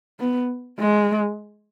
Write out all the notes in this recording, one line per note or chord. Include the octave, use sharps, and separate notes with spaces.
B3
G#3